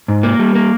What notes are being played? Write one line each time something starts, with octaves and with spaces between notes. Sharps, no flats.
G#2
A#3
G3
A#3